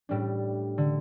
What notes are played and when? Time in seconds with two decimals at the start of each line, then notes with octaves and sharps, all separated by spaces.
0.09 A2 G3 D4
0.78 D3